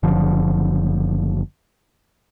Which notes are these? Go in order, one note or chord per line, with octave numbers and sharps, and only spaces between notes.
F#1 D3 F3